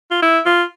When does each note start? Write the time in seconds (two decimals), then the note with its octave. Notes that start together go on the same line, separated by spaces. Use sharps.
0.11 F4
0.22 E4
0.46 F4